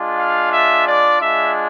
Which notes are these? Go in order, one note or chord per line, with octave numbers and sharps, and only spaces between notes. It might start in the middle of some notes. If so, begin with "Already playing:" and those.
Already playing: G#3 D4 F4
F5
E5
D5
G#3 D4 F4 E5